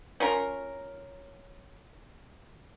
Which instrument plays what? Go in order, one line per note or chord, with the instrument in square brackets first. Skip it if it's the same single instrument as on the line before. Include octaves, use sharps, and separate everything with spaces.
[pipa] C#4 F4 A#4